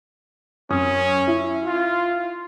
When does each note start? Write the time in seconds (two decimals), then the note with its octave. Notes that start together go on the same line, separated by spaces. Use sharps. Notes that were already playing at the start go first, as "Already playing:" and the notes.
0.70 F#2 C#4 D#6
1.27 E4
1.65 F4